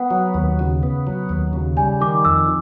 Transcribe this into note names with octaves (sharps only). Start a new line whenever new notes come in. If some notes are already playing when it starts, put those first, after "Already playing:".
Already playing: B3 F#5
F#3
D#2
C#3
B3
F#3
D#2
C#3
G3 G#5
D#3 D6
F2 E6